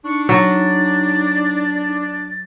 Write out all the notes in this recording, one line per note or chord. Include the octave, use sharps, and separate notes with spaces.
D4 D#4 C#6
F#3 A6